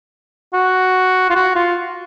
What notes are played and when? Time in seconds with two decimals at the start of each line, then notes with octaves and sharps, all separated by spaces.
0.54 F#4
1.30 F4
1.35 F#4
1.56 F4